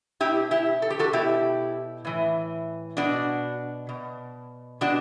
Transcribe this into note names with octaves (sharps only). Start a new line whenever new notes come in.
B2 E4 G4
E4 G4
A4
G4
F#4 A4
B2 E4 G4
A2 E3
B2 D4 F#4
B2
B2 D4 F#4